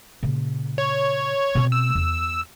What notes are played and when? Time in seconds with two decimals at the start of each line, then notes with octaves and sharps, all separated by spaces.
0.23 A#2 C#3
0.78 C#5
1.55 B2 C4
1.72 E6
1.95 E2